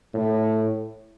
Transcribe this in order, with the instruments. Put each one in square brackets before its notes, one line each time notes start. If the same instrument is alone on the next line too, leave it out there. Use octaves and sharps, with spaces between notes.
[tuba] A2